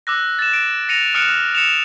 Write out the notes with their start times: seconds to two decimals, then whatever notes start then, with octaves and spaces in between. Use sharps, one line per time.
0.07 D6 E6 F#6 A#6
0.39 A6 E7
0.53 D7
0.89 A#6 C#7 D#7 F7
1.14 D#6 F6 F#6 C#7 D7 E7
1.55 C#7 E7 F7